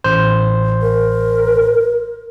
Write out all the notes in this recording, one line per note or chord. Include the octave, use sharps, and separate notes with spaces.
A1 C5
A#4